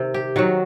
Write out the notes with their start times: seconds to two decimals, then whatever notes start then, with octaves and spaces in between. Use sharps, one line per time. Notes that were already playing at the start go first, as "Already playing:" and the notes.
Already playing: C3 D#3
0.14 G4
0.36 D#3 F#3 F#4